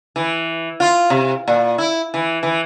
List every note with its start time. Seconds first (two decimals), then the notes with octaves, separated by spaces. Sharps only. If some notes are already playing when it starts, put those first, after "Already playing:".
0.16 E3
0.80 F4
1.10 C3
1.48 A#2
1.78 E4
2.14 E3
2.43 E3